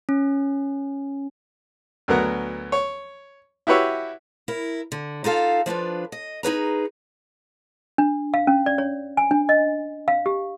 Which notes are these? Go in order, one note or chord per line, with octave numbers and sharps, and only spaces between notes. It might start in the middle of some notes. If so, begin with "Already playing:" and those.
C#4
D2 F#3 B3 A#4 F#5
C#5
E4 F#4 G4 B4 C#5 E5
E4 A#4
D3
D#4 F4 A4 F5
F3 D4 F4 B4
D#5
D#4 G#4 B4 A#5
D4
F5
C#4
D5
C#5
G#5
D4
D#5
F5
G4